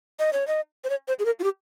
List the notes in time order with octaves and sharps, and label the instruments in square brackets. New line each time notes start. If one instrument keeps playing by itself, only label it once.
[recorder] D#5
C#5
D#5
C5
C#5
C5
G#4
A#4
F4
G4